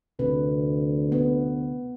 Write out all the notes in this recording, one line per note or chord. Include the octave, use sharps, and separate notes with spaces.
D2 C3 B4
B3